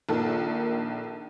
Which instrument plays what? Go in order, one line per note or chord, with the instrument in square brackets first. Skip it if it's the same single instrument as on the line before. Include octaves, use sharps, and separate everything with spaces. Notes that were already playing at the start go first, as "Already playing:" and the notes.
[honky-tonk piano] A#1 D#3 A4